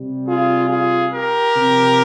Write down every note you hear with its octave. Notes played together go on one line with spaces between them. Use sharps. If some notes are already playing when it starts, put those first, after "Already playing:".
Already playing: C3 G3
F4 G#4
F4 G#4
G4 A#4
C3 F3